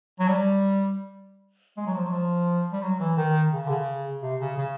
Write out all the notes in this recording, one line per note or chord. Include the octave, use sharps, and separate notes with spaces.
F#3
G3
G#3
F#3
F3
F#3
F3
G3
F#3
E3
D#3
C#3
D3
C#3
C3
C#3
C#3